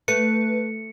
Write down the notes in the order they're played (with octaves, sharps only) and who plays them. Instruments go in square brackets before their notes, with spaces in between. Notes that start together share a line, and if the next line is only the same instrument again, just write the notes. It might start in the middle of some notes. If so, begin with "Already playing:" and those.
[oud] A3 [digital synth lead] B4 [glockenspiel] C#7